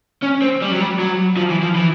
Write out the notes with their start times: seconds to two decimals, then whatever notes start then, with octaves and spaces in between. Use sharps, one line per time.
0.23 C#4
0.42 C4
0.62 G3
0.71 F#3
0.80 G3
0.99 F#3
1.37 F3
1.50 E3
1.62 F3
1.75 E3